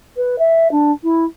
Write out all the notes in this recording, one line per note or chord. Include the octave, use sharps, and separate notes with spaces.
B4
E5
D4
E4